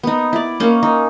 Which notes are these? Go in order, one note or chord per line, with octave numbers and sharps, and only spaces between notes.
B3 D#4
E4 D5
A#3 C#4 D#4
D#4